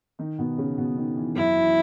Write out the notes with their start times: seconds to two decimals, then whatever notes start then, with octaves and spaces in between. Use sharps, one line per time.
0.19 D#3 D#4
0.39 B2 B3
0.58 C#3 C#4
0.78 B2 B3
0.98 D#3
1.17 E3
1.36 F#2 F#3 E4
1.56 E3